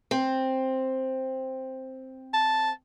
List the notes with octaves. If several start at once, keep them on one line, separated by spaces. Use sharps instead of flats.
C4
A5